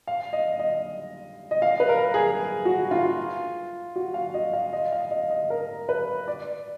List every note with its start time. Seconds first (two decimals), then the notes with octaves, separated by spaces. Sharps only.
0.07 F5
0.33 D#5
0.59 D#5
1.51 D#5
1.62 F5
1.80 B4
1.89 A#4
2.14 G#4
2.65 F#4
2.91 F4
3.96 F#4
4.14 F5
4.34 D#5
4.53 F5
4.73 D#5
4.92 F5
5.11 D#5
5.30 D#5
5.50 A#4
5.89 B4
6.28 D5